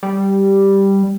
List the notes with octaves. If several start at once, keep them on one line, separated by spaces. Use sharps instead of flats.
G3